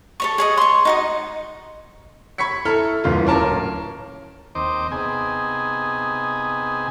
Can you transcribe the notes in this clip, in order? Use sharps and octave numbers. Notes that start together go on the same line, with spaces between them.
A4 C#5 C#6
G#4 C#5 D#5
C6 C#6
D#4 F#4 D#5
B5 C#6 G#6 B6 C#7
E4 A4 A#5 F6
D#1 E3 F4
D1 C#4 A#4 A5 D6
D#2 C4 C5 D#5 D6
C3 B3 D#4 G#4 G#5